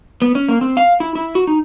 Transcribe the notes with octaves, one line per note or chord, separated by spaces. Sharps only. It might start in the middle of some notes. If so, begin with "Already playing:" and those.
B3
C#4
A#3
C4
F5
E4
E4
F#4
D#4